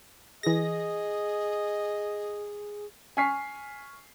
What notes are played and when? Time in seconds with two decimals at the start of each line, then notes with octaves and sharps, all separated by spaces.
0.43 E3 G#4 D#5 A#6
3.17 G#5 C#6 F6 B6 C7